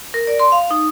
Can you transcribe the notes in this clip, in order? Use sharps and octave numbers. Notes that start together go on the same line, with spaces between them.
A#4
D5
C6
F5
D#4